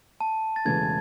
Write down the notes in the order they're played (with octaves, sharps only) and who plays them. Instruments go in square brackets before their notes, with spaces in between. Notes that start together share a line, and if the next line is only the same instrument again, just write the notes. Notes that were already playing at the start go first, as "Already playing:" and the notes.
[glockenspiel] A5
A6
[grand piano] E1 E2 C#3 E3 A3 [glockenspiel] G#6